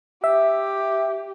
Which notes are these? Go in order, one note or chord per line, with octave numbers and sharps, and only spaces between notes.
G4 E5